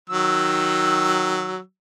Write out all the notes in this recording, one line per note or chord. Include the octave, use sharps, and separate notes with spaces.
D#3 F#3 E6